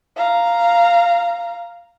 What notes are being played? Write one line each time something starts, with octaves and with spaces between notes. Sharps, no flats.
F5 A#5